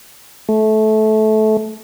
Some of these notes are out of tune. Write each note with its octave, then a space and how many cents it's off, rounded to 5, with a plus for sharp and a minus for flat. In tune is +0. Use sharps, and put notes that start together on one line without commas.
A3 -20